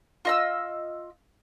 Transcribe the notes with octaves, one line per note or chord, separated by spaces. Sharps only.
F4 D#5 E6